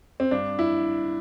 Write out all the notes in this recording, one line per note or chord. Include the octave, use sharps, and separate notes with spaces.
C4
G2 D4
E4